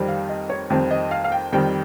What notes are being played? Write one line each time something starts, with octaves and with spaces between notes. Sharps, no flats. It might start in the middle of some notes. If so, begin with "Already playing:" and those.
Already playing: F2 D#3 G3 C4
F5
D#5
C#5
F2 D#3 G3 C4
D#5
F5
F5
G5
F2 D#3 G3 C4 G5